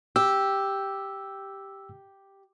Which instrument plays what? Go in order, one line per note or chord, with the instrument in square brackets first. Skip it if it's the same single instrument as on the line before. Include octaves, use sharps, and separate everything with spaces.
[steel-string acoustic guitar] G4 [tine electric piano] E6